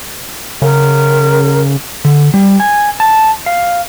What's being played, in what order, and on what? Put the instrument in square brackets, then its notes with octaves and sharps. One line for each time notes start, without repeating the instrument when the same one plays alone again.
[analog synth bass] C#3 [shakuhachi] A#4
[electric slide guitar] D3
G3
G#5
A5
F5